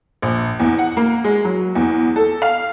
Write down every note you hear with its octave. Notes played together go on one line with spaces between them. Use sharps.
A#1
E2
F#5
A#3
G#3
F#3
E2
A4
F5